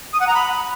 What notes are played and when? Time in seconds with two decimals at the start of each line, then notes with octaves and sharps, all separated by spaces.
0.12 D#6
0.20 F#5
0.27 A#5
0.34 B5